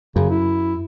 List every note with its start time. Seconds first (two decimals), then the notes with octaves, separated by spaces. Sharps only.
0.16 F#2 C#3
0.30 E4